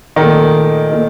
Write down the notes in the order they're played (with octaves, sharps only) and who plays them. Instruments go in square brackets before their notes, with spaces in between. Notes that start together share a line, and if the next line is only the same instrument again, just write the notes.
[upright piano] A#2 A3 D#4 A#4 [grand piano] D#3
[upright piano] A#2 A3 D#4 A#4